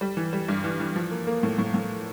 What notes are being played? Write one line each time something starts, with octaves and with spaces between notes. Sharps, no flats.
G3
E3
G3
G2
E3
E3
F3
A#3
A#3
A2
A2
A2